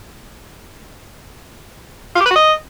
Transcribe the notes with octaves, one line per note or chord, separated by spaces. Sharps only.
F4
G4
B4
F#4
D#5